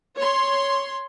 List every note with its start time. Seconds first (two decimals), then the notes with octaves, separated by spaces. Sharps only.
0.18 C#5 C6